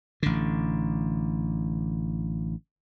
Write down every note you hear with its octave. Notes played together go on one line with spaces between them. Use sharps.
A1 D3